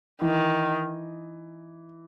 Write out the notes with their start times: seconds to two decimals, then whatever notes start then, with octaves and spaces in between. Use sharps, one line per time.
0.22 D#3 E3